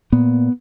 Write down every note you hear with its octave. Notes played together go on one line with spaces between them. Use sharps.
A#2 B3